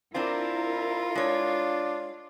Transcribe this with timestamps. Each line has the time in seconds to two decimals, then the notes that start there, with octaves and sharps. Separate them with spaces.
0.15 C4 D4 E4 F4 A#4
1.15 G#3 D4 C#5